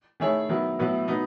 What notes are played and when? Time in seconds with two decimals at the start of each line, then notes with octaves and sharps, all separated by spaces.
0.20 D#3 A3 E4 G#4 C#5
0.49 D#3 F#3 B3 E4
0.79 A2 F#3 B3 E4
1.08 F#3 B3 D#4